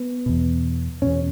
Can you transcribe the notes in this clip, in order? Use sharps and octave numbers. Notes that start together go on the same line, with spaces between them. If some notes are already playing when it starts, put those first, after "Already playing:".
Already playing: B3
E2 B2
E2 B2 C#4